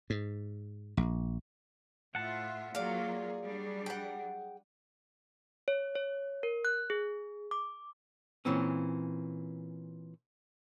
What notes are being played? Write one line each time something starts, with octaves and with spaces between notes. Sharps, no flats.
G#2
A#1
A2 F4 E5 F#5 A5
F#3 A#3 F4 G#4 D5 F5
F#3 G3 D4
F#5 G5
C#5
C#5
A#4
F#6
G#4
D6
A#2 E3 C4 C#4